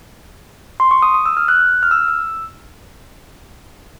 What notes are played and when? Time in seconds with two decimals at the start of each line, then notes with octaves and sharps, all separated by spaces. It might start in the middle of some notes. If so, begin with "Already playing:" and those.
0.80 C6
0.91 C#6
1.02 D#6
1.14 D#6
1.26 E6
1.37 F6
1.48 F#6
1.83 F6
1.91 E6
2.08 E6